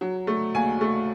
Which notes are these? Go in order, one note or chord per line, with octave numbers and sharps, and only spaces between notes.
F#3
A3
D#2 G#5
A3